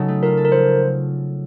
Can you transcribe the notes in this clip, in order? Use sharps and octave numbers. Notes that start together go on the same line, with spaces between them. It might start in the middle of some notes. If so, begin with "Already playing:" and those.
Already playing: C#3 F#3 D#4 A4
A3
F4 A#4
A4
A#4
F3 C5